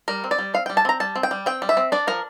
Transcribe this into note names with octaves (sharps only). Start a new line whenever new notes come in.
G3 A#4
C4
D5
G3
C4 F5
G3 G5
A5
C4 A#5
G3 A5
C4
G5
G3
C4 G5
G3
E5
C4
D4 D5
F3 A#4